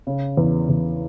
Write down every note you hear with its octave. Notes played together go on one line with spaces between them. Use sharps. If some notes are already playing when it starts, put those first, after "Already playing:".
C#3
E2
E2